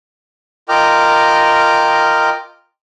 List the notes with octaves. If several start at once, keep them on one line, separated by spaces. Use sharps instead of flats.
F4 A#4 D#5 G5 D6 F6